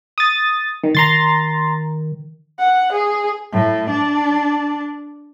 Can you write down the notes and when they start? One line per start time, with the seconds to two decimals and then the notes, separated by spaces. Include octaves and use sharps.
0.18 D#6 A6
0.84 D#3
0.95 D#3 A#5 C6 A6
2.59 F#5
2.92 G#4
3.53 A2
3.89 D4